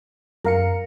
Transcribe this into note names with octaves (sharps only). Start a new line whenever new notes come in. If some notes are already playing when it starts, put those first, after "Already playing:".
F#2 A#4 F5 C#7